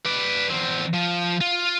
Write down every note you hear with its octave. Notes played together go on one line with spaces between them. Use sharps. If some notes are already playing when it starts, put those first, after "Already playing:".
B4 D5
E2 C4
F3
F4